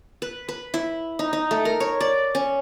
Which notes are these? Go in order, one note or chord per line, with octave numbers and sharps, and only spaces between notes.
B4
B4
E4
D#4
D#4
A3
A#4
C#5
D5
C#4